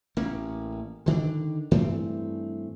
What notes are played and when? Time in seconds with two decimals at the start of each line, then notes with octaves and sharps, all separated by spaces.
0.17 A1 A#3 C#4
1.06 D3 D#3 A#3 D4
1.71 G2 E3 A3 C4